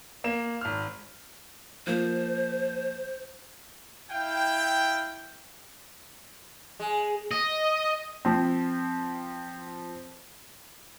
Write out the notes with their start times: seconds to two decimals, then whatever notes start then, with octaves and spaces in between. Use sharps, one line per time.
0.24 A#3 E7
0.61 G#1 F6
1.87 F3 A#3 C5
4.11 E4 F5 G5
6.80 G#3
7.31 D#5
8.25 F3 C4